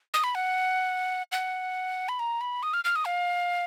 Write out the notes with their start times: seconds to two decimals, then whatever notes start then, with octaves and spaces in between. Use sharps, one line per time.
0.14 D#6
0.24 B5
0.35 F#5
1.32 F#5
2.09 B5
2.19 A#5
2.41 B5
2.63 D#6
2.74 F6
2.84 F6
2.96 D#6
3.05 F5